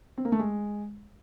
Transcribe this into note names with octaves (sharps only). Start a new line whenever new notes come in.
C4
A#3
A3
G#3